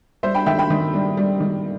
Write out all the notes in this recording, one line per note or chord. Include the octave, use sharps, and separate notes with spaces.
G3 C5 E5
G5 B5
D#3 E5 G5
G5 B5
D#3
G3
G3
D#3